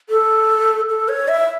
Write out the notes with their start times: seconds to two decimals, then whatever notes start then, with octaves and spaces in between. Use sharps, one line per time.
0.09 A4
0.89 A4
1.09 C#5
1.28 E5